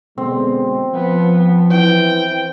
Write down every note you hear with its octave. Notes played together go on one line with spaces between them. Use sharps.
B2 D3 G#3 C4
F3 B3
E3 G5